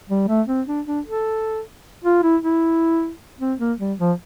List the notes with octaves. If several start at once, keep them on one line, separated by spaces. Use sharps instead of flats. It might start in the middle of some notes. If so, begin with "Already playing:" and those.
G3
A3
C4
D4
D4
A4
F4
E4
E4
C4
A#3
G3
F3